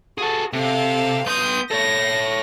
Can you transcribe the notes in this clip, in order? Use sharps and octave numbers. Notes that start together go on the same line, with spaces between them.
F#4 G#4 A4
C3 A4 F5
B3 C6 D#6 G6
A4 C#5 A#6